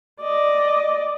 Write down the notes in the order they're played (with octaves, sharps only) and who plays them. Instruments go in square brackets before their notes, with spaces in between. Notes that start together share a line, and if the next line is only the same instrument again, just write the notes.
[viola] D5 D#5